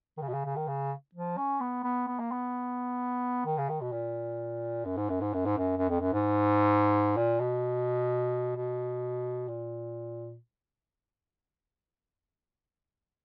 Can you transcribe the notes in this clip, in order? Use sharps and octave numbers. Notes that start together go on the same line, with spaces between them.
D#3
C#3
B2
C#3
C#3
D#3
C#3
F3
C#4
B3
B3
B3
A#3
B3
D#3
C#3
D#3
B2
A#2
F#2
G#2
F#2
G#2
F#2
G#2
F#2
F#2
F2
F#2
G#2
A#2
B2
B2
A#2